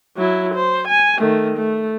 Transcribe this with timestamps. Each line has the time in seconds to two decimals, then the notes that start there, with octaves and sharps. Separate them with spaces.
0.17 F#3 E4
0.54 C5
0.88 G#5
1.17 D#3 A3
1.57 A3